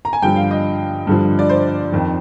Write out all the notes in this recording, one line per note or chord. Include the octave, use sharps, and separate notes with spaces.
A#5
G#5
G2 D3 F3 G5
F5
D#5
G2 D3 F3
D5
C5
F2 D#3